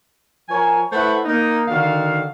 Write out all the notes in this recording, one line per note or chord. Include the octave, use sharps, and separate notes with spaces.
F3 A#4 C#5 G#5
A3 E4 B4 C5 E5 F#5
A#3 D#4
D3 D#3 F#4 F5